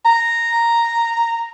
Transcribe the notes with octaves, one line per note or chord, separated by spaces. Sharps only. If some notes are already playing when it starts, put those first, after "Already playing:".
A#5